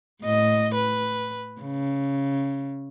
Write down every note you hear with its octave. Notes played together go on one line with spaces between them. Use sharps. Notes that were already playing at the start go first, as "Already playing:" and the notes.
A2 D#5
B4
C#3